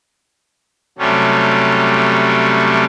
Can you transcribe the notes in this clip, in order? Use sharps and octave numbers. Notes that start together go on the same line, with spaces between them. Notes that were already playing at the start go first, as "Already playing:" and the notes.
C3 F#3 G3 A3 C#4